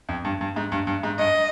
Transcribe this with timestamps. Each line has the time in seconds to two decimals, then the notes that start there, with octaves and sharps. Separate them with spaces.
0.09 F2
0.25 G2
0.41 G2
0.56 G#2
0.72 G2
0.87 G2
1.03 G#2
1.19 G2 D#5